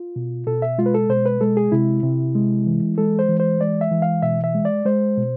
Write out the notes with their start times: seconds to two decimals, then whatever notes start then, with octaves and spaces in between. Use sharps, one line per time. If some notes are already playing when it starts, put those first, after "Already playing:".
Already playing: F4
0.16 B2
0.47 B2 A4
0.62 E5
0.78 G#3 F4
0.86 B4
0.94 A4
1.09 B2 C5
1.26 B4
1.41 G#3 A4
1.57 G#4
1.72 C3 E4
2.03 C3
2.35 G#3
2.66 E3
2.98 G#3 A4
3.19 C5
3.29 E3
3.40 C5
3.61 G#3 D5
3.81 E5
3.91 E3
4.02 F5
4.22 B2 E5
4.44 E5
4.54 G#3
4.65 D5
4.86 G#3 C5
5.17 B2